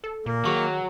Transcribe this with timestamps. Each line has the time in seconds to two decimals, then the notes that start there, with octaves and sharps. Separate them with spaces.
0.04 A4
0.26 A#2 A#3
0.45 D#3 F#3 G#4 C#6